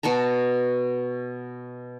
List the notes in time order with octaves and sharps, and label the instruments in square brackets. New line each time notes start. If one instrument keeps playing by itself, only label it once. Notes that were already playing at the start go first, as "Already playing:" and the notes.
[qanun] B2 F#4 A5 A#5